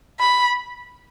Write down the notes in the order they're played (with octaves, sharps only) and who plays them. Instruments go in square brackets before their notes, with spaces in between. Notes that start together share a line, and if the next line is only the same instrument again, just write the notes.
[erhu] B5